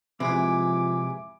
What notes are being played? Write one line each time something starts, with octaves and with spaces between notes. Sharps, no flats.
C3 E3 F3 G#3 E4 D6